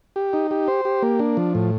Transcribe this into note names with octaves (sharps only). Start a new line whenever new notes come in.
G4
D#4
G4
C5
G4
A#3
D4
F3
A2